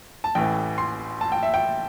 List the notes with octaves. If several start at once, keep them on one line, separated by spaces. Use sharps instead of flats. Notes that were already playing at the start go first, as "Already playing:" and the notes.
A5
A1 A2 E3 G5
C6
A5
G5
E5
G5